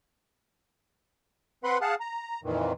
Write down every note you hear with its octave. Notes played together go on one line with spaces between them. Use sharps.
C4 B4 F#5 B5 C6
G#4 F5 F#5 A5
A#5
F2 A#2 D#3 E3